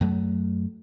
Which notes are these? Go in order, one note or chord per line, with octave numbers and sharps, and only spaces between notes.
F#2 F#3 A3